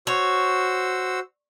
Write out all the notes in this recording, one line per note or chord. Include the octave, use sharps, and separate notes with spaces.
F#4 C5 C#5 E6